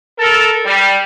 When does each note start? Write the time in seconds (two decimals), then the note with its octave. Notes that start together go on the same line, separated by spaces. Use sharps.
0.19 A4 A#4
0.65 G3